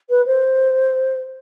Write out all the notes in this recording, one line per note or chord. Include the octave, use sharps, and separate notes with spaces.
B4
C5